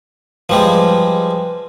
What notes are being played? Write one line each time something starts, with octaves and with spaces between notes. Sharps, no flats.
F3 G3 G#3 B4